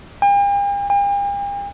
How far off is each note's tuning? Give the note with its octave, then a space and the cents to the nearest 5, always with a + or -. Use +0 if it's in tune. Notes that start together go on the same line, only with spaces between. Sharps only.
G5 +45
G5 +45